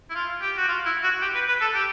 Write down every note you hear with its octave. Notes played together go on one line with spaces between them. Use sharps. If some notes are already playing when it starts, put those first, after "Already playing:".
E4
F4
G4
F#4
F4
E4
F#4
G4
B4
B4
A4
G4